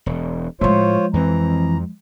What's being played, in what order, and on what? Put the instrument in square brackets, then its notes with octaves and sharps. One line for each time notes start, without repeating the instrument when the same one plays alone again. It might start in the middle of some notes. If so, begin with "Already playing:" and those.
[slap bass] E1
[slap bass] A2 A3 [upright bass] F3 G#3 [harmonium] F4 C5 C#5
[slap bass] F2 C4 [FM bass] E3 [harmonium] A#5